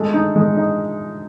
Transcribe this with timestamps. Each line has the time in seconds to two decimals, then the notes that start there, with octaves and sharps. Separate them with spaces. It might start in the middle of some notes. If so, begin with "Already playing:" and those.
Already playing: G#3 A3
0.14 D#4
0.36 G#3
0.57 D#4